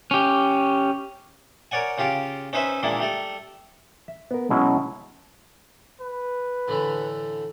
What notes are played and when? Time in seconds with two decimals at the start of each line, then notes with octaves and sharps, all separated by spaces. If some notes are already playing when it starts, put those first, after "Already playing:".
0.11 C#4 G4
1.71 A#4 C#5 D5 F#5 G#5
1.98 C#3 F4 G4 F5 D6
2.53 C#4 D#4 B4 C5 E5 B5
2.83 A#2 D#3 G#3 A#3 D4 E4
3.00 G3 A3 A4
4.08 E5
4.31 B3 A#4
4.50 B2 F#3 G#3 C#4 E4
6.01 B4
6.68 A2 D3 E3